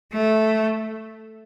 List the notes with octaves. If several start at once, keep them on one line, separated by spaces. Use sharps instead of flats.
A3